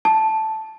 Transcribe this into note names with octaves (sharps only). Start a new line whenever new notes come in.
A5